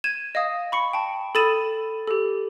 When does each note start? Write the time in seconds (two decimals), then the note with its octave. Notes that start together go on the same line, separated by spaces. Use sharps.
0.04 G#6 D#7 E7
0.35 D#5 F5 D#6
0.72 B5 C#6 C#7
0.93 G5 A5
1.35 A4 B5 D#6 A6 D#7 E7
2.08 G4 A4